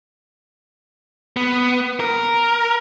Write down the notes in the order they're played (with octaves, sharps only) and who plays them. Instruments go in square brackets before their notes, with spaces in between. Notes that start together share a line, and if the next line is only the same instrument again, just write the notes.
[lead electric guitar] B3
A#4